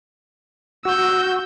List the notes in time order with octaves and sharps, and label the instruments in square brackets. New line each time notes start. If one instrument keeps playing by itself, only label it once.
[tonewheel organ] F#4 [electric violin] E6 G6